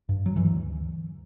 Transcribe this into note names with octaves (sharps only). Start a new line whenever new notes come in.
G2
F#3
D2 E3